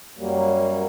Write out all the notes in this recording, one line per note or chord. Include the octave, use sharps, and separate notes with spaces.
F#2 F#3 G3 A#3